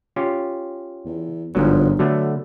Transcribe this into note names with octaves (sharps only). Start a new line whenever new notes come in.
C#4 F4 G4
E2
G1 G#2 F3 F#3
D3 F#3 A3 B3